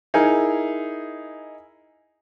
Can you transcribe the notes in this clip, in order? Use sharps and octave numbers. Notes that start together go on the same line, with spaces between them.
D#4 E4 G#4 A#4